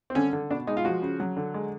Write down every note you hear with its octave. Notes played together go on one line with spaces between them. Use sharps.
C4
D3 C#4
D3
B2 D4
G#3 D#4
F4
F3 F#4
C#3
F#3
D3
G#3